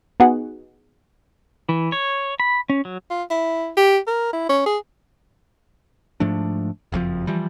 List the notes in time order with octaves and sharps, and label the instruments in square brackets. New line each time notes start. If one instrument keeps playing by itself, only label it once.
[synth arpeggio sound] B3 D#4 F#4 G#4 F#5
[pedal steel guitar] E3
C#5
B5
C#4
F#3
[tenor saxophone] F4
E4
G4
A#4
E4
C#4
G#4
[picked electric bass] G#2 F3 A3 D4
F#1 F2 B2 F3
E3 F3 G3